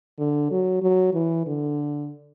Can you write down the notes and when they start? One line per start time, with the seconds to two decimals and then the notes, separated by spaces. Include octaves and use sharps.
0.19 D3
0.51 F#3
0.82 F#3
1.14 E3
1.46 D3